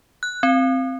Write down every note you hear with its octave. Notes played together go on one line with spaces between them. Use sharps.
F#6
C4